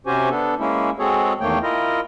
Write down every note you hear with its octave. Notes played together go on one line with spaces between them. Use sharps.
C3 C#4 F#4 G4 C5 G#5
B3 D4 A4
G#3 A#3 C#4 E4
G#3 C4 F#4 G#4 A4 C#5
E2 D#3 A3 A#3 C#5 G5
E4 F4 A#4 D#5